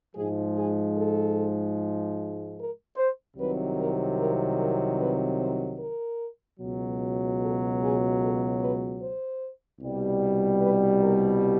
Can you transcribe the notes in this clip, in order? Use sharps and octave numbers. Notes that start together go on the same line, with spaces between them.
G#2 F3 G#3 G#4
G#4
A4
A#4
C5
C2 C3 D#3 F#3 B4
A#4
A#4
A#4
B4
C5
A#4
C#2 B2 F#3
A4
G#4
A4
B4
C5
C2 B2 G3
B4
A#4